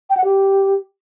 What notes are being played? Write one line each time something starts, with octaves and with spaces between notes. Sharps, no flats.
G5
F#5
G4